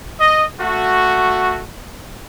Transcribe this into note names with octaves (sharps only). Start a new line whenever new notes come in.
D#5
A3 F#4